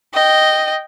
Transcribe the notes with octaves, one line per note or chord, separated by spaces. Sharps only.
D#5 G5